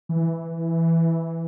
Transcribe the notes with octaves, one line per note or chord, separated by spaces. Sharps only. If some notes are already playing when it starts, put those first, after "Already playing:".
E3